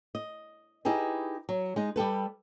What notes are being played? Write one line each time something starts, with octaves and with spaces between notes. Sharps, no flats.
D#5
D#4 E4 G4 G#4 B4
F#3
G#3 D#4
G3 G4 A4 B4